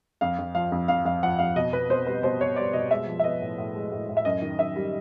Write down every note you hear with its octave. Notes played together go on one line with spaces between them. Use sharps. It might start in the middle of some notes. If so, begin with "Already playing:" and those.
F2 F5
F2
F3 F5
F2
F2 F5
F2 F5
F3 F#5
F2 F5
B2 D#5
B2 B4
B2 C5
G3 B4
B2 C5
B2 C#5
G3 D5
B2 D#5
G#3 E5
F3
E5
B3 D#5
A2
A2
G#3
A2
A2
E5
F#2 D#5
D#3
F#2 E5
G3